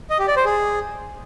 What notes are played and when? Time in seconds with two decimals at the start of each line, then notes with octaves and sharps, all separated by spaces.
0.10 D#5
0.19 G4
0.28 D5
0.36 C5
0.45 G#4